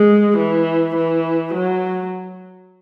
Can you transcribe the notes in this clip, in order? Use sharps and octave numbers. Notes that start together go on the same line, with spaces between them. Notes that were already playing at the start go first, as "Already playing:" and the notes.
Already playing: G#3
E3
E3
F#3